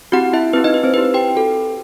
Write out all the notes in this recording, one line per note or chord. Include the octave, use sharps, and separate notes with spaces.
C4 E4 F#4 G4 F#5
E4 E5
C4 E4 G4 B4
D#4 D#5
B4
C4 C5
C4 E4 G4 B4
G4 G5
C4 F#4 A4